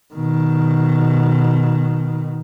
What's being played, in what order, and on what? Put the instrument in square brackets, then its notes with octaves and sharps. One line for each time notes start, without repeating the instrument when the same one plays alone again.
[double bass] B2 D#3